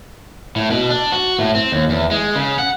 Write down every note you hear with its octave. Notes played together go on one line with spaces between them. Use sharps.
A2
B2
D4
F#4
A2
C4
D#2
E2
G#3
C#3
F#5